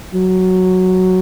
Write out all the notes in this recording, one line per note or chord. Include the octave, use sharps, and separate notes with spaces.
F#3